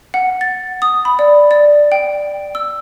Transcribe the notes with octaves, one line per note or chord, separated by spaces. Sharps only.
F#5
A6
D#6
B5
D5
D5
G5
E6